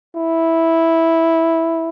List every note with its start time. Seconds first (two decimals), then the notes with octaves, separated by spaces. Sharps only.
0.16 E4